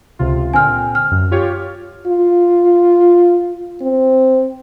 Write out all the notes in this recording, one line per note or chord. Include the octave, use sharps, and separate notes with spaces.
C#2 C3 F4
A#2 D3 C4 G#5 F6
F6
F#2
F4 G4 C#5
F4
C4